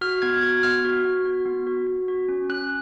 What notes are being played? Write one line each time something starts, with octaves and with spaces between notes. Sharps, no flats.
F#4 F6
B3 G#6
F#4 G#6
B3 F6
F#4
F#4
F#4
B3
F#4
F#4
F#4
C#4
C#4 F#6